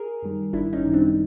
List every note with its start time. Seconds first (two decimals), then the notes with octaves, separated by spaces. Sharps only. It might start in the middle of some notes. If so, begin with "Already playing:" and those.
Already playing: G#4 A#4
0.22 F#2 D#3 G3
0.53 G#1 D4 E4
0.73 C#4 D#4
0.84 F#2 D#3 G3
0.93 C4 D4